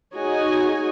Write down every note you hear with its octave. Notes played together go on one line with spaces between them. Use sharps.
D#4 F#4 G#4 C#5 D#5 G#5